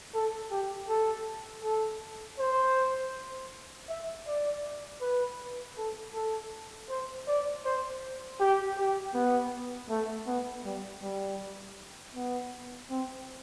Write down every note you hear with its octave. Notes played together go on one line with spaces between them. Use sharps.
A4
G4
A4
A4
C5
E5
D5
B4
A4
A4
C5
D5
C5
G4
G4
B3
A3
B3
G3
G3
B3
C4